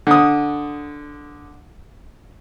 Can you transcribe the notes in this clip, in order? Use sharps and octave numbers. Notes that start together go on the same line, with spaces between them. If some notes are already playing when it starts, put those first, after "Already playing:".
D3 D#6